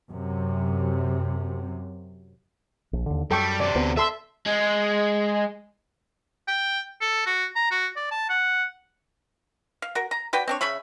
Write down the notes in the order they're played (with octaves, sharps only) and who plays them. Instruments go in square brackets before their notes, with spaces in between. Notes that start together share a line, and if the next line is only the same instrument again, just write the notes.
[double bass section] F#2 C3
[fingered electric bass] A#1
D#2 D3
[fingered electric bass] F#2 [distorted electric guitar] G3 [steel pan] A4 G5 C#6
[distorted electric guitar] C3 D4 [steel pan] D5
[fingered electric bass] D2 B3 C4
[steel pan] A4 C6 E6 [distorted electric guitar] E5
[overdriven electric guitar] G#3
[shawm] G5
A4
F#4
A#5
F#4
D5
A5
F#5
[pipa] F5
F#4 A#4
A#5
F#4 B4 D5 G5
C4 D4 C#5
C#3 C#5 E5 B5